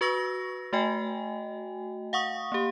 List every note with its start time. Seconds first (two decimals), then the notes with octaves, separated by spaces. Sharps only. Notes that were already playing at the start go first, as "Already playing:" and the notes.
0.01 F#4 B4 C#6 E6 A#6
0.73 A3 F#4 D#5 G5 G#5
2.13 F5 F#5 C#6 D#6
2.52 A#3 G4